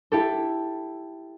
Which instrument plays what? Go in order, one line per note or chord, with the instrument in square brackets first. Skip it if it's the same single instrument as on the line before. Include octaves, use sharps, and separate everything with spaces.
[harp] E4 G4 A4